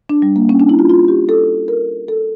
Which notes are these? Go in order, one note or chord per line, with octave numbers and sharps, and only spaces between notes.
D4
G3
A#3
C#4
D4
E4
F4
F4
G4
A4
A#4
A4